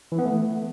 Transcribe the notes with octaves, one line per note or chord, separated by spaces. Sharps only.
E3
B3
A3